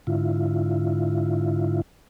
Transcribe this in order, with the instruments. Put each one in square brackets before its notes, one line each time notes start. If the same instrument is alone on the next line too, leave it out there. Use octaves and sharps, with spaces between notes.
[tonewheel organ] G#2 D3 E4 F4